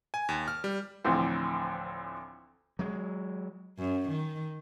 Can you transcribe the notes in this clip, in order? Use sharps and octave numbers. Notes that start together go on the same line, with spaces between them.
G#5
D#2
F6
G3
D2 A2 E3 F3 C4
F#3 G#3
F#2
D#3